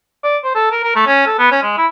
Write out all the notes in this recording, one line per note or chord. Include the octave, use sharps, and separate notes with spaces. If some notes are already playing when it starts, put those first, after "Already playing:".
D5
C5
A4
A#4
A#4
A3
C#4
A4
B3
C#4
G#3
E4